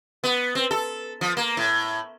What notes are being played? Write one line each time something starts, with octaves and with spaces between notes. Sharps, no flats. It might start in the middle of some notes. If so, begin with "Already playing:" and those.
B3
C4
A4
F3
A#3
A2